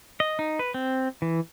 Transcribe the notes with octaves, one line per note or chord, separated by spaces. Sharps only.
D#5
D#4
B4
C4
E3